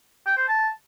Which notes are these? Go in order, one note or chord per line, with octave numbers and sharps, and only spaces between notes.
G5
C5
A5